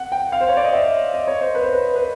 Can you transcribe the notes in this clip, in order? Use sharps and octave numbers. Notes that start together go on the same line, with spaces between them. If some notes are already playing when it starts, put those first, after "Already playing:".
Already playing: F#5
G5
F5
C5
C#5
D5
D#5
E5
D#5
C#5
C5
B4
C5
B4
B4